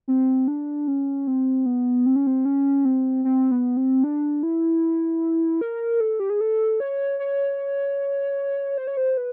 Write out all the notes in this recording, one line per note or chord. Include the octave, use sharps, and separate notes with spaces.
C4
D4
C#4
C4
B3
C4
C#4
C4
C#4
C4
C4
B3
C4
D4
E4
A#4
A4
G4
G#4
A4
C#5
C#5
C5
C#5
C5
B4